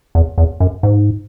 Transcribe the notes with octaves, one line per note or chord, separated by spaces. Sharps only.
E2
E2
F#2
G#2